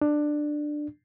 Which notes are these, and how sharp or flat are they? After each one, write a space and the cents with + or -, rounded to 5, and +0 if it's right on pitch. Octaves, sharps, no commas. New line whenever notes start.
D4 +15